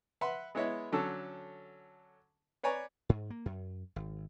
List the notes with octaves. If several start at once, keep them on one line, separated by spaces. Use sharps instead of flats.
B4 E5 F#5 B5 C6
G#3 B3 E4 C#5 D#5 E5
D3 F#3 C#4 A4 E6
B4 C#5 D5 G#5 A#5 C#6
G#2
A#3
F#2
G#1